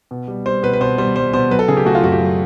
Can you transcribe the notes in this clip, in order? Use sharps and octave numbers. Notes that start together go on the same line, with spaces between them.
B2
G3
G3 C5
B2 B4
B4
B2 C5
G3 C5
G3 C5
B2 C5
F#3 B4
A4
C#3 G#4
G4
A3 F#4
F4
F#2 F#4
G4
F#3